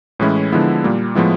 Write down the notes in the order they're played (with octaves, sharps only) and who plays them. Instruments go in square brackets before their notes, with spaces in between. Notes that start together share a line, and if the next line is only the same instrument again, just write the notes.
[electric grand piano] A2 E3 G#3 C#4 E4
D3 F3 G#3 B3 E4
A#2 G3 A#3
A2 F3 G#3 B3 E4